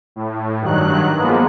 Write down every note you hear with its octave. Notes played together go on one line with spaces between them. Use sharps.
A2
G2 D#3 F#3 F#6
F3 G#3 A#3 B3